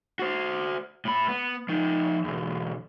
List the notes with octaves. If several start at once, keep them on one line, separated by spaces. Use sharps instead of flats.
F#4 C5
A2 B5
B3
F3 D#4
B1 E2